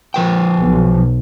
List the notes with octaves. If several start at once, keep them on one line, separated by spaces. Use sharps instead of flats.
F3 B4 G5
B1